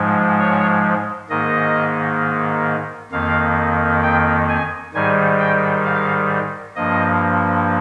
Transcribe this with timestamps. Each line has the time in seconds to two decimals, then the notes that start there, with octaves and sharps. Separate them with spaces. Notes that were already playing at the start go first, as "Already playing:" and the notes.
Already playing: G#2 F3 G#3
0.40 C#5
1.30 G#2 D#3 A#3 D#5
3.12 F2 D#3 A#3 F5
4.03 G5
4.49 G#5
4.94 G#2 D#3 G3 G#5
5.39 G5
5.85 F5
6.76 G2 F3 A#3 D#5